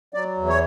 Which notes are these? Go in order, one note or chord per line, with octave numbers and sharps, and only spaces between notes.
F#3 D5
E2
C#5